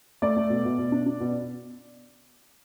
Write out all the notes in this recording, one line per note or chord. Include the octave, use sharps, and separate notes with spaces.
A3 D5
A3
B2
B2
B2
D4
D4
B2